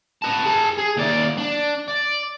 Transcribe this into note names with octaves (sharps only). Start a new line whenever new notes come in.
B4 A5
G#4 A5
G#4
D#2 D5
D4
D5